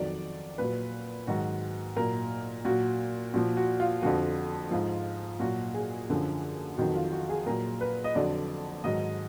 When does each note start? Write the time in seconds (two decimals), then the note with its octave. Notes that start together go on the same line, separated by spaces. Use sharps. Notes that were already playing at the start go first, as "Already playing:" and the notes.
Already playing: F2 D#3 F#3 D5
0.58 A#2 F#3 B4
1.27 G#2 D#3 F#3 F#4
1.96 A#2 F#3 A#4
2.65 A#2 F#3 F#4
3.34 A#2 F3 F#4
3.57 F#4
3.80 F4
4.02 F2 D3 F3 F#4
4.71 G#2 F3 F4
5.40 A#2 F#3 F#4
5.74 G#4
6.09 F#2 D3 F3
6.77 F2 D#3 F#3 F#4
6.95 F4
7.12 F#4
7.29 G#4
7.46 A#2 F#3 A#4
7.81 B4
8.04 D#5
8.15 F2 D3 F#3 D5
8.84 G#2 D#3 F#3 D#5